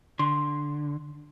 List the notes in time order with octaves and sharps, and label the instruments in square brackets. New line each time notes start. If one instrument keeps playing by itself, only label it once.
[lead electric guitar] D3 [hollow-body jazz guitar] C6